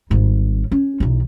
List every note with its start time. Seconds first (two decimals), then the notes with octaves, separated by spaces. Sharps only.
0.10 G#1 G3
0.72 C#4
1.00 B1 E2